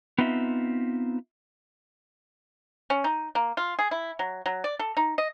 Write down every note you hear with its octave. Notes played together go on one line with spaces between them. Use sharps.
B3 C4 D#4 F4 E5
C#4
D#4
A#3
F4
G#4
E4
F#3
F#3
D5
A4
D#4
D#5